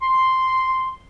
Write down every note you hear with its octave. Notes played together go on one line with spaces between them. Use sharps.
C6